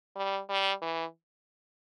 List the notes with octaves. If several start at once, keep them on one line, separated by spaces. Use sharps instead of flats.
G3
G3
E3